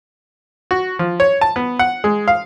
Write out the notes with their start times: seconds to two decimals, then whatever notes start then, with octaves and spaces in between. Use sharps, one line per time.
0.71 F#4
0.99 F3
1.20 C#5
1.41 A5
1.56 B3
1.79 F#5
2.04 G#3
2.28 F5